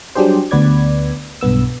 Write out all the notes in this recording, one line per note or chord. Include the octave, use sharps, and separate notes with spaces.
F#3 G3 D4 G4 G#4 C5
D2 B3 B4 D5 G#6
B1 G2 B3 E6